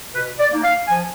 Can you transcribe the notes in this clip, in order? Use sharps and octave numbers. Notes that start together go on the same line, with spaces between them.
B2 B4
D5
A#3 D#4
F5
F3 G#5